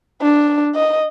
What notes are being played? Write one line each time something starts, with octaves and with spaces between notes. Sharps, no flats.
D4
D#5